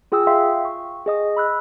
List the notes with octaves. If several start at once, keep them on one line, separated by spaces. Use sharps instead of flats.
F4 G#4 G5 D#6 E6
E5 F5 G5 C6
C#6
G#4 D#5 D#6
B5 E6 F#6